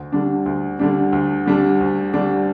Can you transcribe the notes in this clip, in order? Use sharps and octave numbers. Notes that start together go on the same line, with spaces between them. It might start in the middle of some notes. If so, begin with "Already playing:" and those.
Already playing: D2
D3 G3 D4
D2
D3 G3 D4
D2
D3 G3 D4
D2
D3 G3 D4